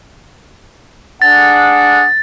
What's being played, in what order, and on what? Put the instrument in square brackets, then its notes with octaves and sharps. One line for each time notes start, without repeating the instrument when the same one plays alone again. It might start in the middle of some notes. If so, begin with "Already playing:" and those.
[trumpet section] D4 G#4 F#5 [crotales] A6